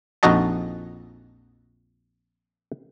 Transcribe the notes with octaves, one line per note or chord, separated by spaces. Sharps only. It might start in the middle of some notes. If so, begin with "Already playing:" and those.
A#1 F2 D#4 F#4 D#5 A5